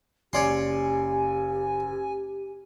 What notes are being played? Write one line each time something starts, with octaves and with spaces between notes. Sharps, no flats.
F#1 G4 C#5 D5 G#5 C6